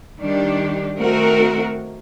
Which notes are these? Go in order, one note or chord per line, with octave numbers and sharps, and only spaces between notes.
D#3 G3 D4 G4
D#3 A3 C4 F#4 A#4